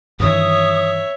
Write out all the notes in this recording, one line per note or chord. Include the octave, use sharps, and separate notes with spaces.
G2 D#3 E3 C#5 E5 D#6